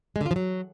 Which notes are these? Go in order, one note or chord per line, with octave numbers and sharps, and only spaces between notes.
G#3
D3
F4
F3
F#3